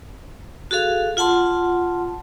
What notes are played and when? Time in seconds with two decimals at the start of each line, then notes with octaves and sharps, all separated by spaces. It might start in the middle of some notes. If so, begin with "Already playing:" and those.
0.71 F#4 G#4 A4 F5
1.17 F4 F#5 A5 C6